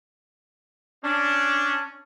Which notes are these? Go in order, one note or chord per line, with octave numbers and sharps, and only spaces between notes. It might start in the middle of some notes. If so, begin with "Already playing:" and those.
C#4 D4